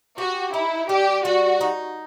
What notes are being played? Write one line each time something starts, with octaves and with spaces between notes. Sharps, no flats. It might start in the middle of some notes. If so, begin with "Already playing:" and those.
F#4 G4
D#4 E4
G3 G4
G3 F#4
D#4